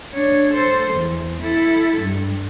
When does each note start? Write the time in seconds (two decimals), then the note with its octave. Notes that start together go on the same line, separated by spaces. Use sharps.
0.14 D4 C#5
0.53 A4 C5
0.94 E2
1.43 E4 A4
2.01 G2